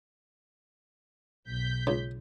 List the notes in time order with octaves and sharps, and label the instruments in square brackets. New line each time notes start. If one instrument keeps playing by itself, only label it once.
[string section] B1 G6 B6
[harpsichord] C#2